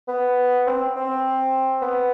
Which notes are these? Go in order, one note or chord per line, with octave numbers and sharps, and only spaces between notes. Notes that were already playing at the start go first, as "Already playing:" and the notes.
B3
C4
C4
B3